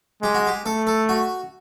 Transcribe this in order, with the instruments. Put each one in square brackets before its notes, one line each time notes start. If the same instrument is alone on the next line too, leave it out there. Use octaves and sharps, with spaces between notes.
[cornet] G#3 [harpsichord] G4
[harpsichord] F#4
G4
[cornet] A3 [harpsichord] A4
[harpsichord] A4
F#4